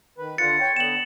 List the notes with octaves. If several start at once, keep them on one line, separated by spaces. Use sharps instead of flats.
D#3 B4
D3 F4 F#5 A6 C#7
C#5 G5
D3 B3 E7 F#7